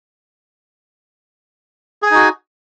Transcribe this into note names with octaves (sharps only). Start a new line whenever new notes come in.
D#4 F#4 G#4 G#5